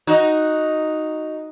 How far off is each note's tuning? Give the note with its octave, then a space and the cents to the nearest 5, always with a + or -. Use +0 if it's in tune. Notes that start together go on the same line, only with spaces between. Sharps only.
D#4 +0 F#4 +0